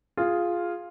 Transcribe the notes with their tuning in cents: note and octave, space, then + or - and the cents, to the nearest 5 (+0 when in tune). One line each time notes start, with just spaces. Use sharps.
F4 +0 G#4 +0